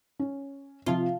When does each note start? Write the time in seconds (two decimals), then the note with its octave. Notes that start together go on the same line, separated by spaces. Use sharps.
0.19 C#4
0.86 C3 F3 F4